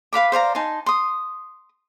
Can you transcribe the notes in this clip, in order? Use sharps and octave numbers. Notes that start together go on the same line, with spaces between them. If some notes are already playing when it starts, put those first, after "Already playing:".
B4 F5 B5 D6
C5 D5 F5 A#5
D#4 G#5 A5 C6
C6 D#6